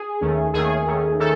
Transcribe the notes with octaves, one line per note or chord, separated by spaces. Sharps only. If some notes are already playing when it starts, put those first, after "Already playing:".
Already playing: G#4
D#2 D#3 A3 C#4
D#2 D#3 A3 C#4 G#4
D#2 D#3 A3 C#4
D#3 A3 C#4 A4